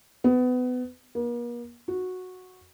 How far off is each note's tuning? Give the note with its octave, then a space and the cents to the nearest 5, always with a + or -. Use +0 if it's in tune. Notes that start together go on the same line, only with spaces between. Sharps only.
B3 +25
A#3 +45
F#4 -10